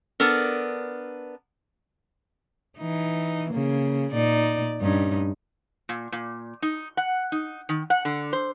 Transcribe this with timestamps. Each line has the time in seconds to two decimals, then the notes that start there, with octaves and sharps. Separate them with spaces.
0.20 B3 D4 A4 A#4
2.78 E3 D#4
3.51 C#3 A#3
4.12 A#2 D#4 D5
4.81 G2 C#4 D#4
5.89 A#2
6.12 A#2
6.62 D#4
6.97 F#5
7.32 D#4
7.69 D#3
7.90 F#5
8.05 D3
8.33 C5